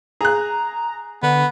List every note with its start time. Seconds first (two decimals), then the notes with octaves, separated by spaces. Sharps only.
0.21 G#4 A#5 F#6
1.23 D3 B3